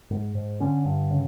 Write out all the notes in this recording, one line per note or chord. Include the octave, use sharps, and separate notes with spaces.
G#2
G#2
D3 C#4
G2
C#3